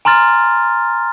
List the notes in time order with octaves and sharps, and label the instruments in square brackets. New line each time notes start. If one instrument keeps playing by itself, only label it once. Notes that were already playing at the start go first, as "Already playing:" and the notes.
[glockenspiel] G#5 A#5 C6 F6 A6